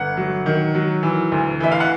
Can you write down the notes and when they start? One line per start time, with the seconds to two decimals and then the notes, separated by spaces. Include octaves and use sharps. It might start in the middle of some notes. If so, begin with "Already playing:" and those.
Already playing: G1 F#5
0.17 F#3
0.46 D#3
0.75 F#3
1.03 E3
1.32 D2
1.60 E3 E5
1.72 F5
1.80 F#5